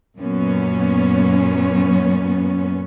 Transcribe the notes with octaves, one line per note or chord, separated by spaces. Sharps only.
F#2 A#2 F#3 B3 C#4